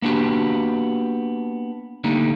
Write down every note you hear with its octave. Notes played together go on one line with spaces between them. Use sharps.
A#3 B3 D4 F#4 G4
D3 G3 A3 A#3 D#4